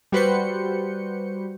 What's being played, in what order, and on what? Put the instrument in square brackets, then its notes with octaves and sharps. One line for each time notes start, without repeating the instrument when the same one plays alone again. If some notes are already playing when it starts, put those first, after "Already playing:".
[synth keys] G3 F#4 B4 C5 G6 C#7